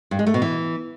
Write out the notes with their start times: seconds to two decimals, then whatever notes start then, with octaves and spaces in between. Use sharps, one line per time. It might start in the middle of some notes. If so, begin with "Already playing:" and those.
0.11 G2
0.19 G#3
0.27 A3
0.34 B2
0.42 E3